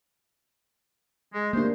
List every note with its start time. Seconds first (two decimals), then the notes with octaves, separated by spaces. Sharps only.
1.34 G#3
1.53 C3 A3 A#3 D4 C5